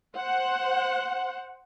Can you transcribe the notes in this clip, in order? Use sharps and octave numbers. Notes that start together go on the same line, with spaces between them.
C5 F#5